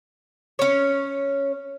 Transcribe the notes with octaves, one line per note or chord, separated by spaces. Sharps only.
C#4 C#5